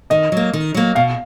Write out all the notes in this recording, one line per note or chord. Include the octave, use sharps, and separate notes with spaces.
D#3 D#5
F#3 A#3
D#3
F#3 A#3
B2 F5